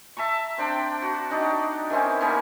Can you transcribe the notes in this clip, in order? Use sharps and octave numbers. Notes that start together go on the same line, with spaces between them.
E5 A5 A#5 C#6
C4 D4 G5
F#4
D4 D#4 F#4 G4
D#3 E3 C4 C#4
G3 A#3 B3 C#4